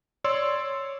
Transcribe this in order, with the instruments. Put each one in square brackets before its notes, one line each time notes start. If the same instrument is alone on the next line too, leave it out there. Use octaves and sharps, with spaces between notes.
[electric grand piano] C#5 D5 C6 E6